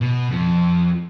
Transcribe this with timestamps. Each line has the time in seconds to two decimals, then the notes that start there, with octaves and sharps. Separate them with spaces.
0.02 B2
0.31 F2